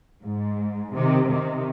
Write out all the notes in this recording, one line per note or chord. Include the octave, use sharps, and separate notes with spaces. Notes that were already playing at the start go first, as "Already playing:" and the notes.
G#2
C3 D#3
C3 D#3